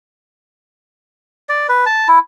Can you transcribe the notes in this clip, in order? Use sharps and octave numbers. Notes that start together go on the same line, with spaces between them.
D5
B4
A5
E4